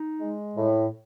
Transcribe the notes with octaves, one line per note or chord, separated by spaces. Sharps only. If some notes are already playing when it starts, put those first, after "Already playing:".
Already playing: D#4
G#3
A2